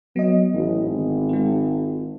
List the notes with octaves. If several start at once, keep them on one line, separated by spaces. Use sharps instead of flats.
F#3 B3 D#5
A1
G#1
G#3 F4